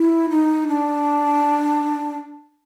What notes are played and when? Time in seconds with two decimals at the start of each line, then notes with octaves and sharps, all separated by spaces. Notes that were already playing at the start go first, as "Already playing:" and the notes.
Already playing: E4
0.30 D#4
0.68 D4